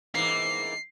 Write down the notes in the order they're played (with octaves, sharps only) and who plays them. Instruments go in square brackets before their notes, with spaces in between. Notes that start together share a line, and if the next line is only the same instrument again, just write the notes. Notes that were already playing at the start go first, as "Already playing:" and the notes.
[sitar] G#2 E3 A#3 [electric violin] C7